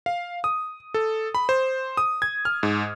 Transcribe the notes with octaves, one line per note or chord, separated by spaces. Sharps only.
F5
D#6
A4
B5
C5
D#6
G#6
F6
G#2